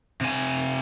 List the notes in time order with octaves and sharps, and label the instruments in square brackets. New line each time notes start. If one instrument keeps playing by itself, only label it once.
[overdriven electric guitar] C3 G#5